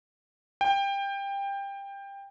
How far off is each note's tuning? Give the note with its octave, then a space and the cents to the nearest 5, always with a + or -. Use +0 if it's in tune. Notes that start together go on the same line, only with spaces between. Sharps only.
G5 +20